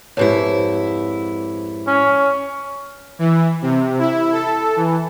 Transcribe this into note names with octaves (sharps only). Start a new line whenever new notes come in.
F2 G#2 E4 G4 B4 C#5
C#4
E3
C3
E4
A4
E3